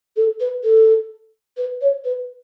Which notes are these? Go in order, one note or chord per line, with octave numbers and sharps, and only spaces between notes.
A4
B4
A4
B4
C#5
B4